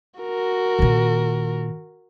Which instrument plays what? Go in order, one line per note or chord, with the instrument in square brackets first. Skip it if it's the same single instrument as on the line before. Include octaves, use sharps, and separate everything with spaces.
[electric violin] F#4 A#4
[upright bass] A#2 D#3